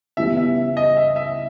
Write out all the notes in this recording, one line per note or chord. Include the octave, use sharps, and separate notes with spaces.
C#3 E3 G3 B3 E5
E5
D#5
E5
E5